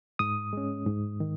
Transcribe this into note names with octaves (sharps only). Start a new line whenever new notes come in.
G#2 D#6
G#3 C#4
G#2
D#3